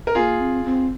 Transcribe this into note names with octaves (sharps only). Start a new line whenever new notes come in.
A#4
A#3 C4 F4 G#4
C4
C4